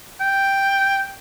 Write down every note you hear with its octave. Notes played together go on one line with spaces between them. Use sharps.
G5